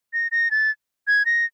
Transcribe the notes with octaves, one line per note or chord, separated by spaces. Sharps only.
A#6
A#6
A6
G#6
A#6